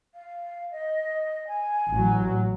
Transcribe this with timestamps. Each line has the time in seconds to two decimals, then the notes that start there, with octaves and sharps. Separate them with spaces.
0.15 F5
0.72 D#5
1.48 G#5
1.91 A1 F#3